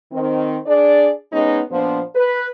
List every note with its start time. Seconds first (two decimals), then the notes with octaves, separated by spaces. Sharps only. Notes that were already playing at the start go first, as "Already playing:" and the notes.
0.12 D#3 C4
0.66 D4 G#4 D5
1.33 G#3 B3 C#4 D#4
1.71 A#2 F3 B3 D4 C5
2.16 B4